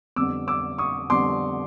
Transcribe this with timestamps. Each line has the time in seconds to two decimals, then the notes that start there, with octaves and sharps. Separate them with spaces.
0.16 F2 D3 G3 B3 D6 E6
0.48 D6 E6
0.78 C#6 D#6
1.10 F2 D3 G3 B3 C6 D6